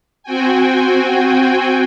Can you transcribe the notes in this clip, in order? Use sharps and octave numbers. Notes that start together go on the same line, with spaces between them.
C4 F#4 G5 G#5